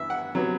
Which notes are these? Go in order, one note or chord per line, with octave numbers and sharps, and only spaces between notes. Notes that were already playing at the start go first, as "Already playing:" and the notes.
Already playing: G2 E3 B3 E5
F#5
C3 F#3 B3